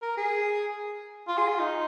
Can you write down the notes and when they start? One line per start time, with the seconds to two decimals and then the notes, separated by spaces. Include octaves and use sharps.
0.02 A#4
0.17 G#4
1.28 F4
1.38 G#4
1.48 F4
1.60 D#4